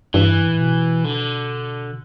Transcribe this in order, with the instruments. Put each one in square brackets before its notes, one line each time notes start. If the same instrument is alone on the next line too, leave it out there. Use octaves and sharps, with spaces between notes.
[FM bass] G2 [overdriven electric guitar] E3
[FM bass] A2
B2
[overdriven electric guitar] D3